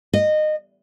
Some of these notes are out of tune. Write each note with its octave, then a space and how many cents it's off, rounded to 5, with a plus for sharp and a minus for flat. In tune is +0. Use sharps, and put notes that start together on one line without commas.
D#5 -20